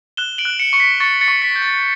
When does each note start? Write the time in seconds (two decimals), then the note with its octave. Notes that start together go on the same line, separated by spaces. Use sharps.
0.17 F#6 E7 G7
0.38 D7 F#7
0.45 F#6
0.59 C#7 E7
0.73 C#6 C#7
0.80 B6 D7
1.00 C#6 A6 C#7
1.21 A6 C#7
1.28 C#6
1.42 B6
1.56 G6
1.62 A6